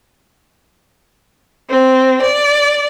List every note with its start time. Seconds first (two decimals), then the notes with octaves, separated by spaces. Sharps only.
1.70 C4
2.21 D5